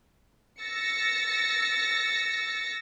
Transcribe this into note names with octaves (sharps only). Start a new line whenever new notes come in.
E6 A6 A#6 C#7